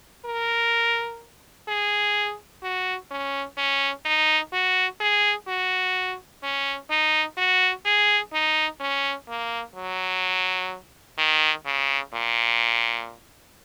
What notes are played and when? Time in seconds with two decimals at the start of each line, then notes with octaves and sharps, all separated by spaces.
0.25 A#4
1.68 G#4
2.63 F#4
3.11 C#4
3.57 C#4
4.05 D#4
4.53 F#4
5.00 G#4
5.48 F#4
6.43 C#4
6.90 D#4
7.38 F#4
7.85 G#4
8.33 D#4
8.80 C#4
9.28 A#3
9.75 F#3
11.18 D#3
11.65 C#3
12.13 A#2